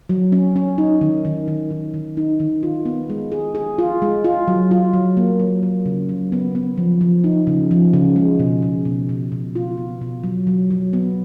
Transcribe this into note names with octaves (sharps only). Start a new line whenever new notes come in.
F#3
C#4
C#4
D#4
D#3
D#3
D#3
D#3
D#3
D#4
D#3
F4
B3
G#3
G#4
G#4
F4
G#3
F4
F#3
F4
F#3
A#3
F#3
F#3
C#3
F#3
B3
B3
F3
F3
D#4
C#3
F3
C#3
G#3
B2
B2
B2
B2
B2
F4
B3
B2
F#3
F#3
F#3
B3